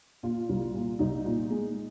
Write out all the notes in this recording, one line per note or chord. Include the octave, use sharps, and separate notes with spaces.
A#2 F4
C2
A#2
C2 D#4
A#2
G#3